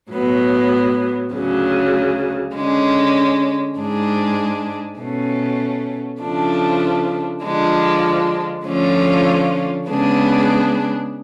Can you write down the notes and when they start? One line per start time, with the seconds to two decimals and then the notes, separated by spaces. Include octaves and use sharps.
0.11 A2 F#3 B3
1.33 D2 C#3 F#3
2.54 D3 G#3 C#4
3.76 G#2 G#3 D4 G#4
4.98 B2 A3 C#4
6.20 C#3 F3 A3 D4
7.42 D3 F3 G#3 D4
8.64 D3 F3 A3 C#4 F4
9.86 C#3 G#3 B3 D4 G#4